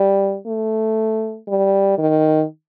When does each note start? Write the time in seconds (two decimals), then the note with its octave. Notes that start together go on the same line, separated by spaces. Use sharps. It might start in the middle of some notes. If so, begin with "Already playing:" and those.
Already playing: G3
0.47 A3
1.48 G3
1.98 D#3